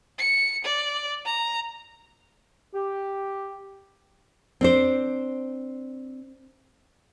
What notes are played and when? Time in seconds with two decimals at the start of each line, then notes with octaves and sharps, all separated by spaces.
0.19 C#7
0.65 D5
1.26 A#5
2.74 G4
4.61 C4 D4 C5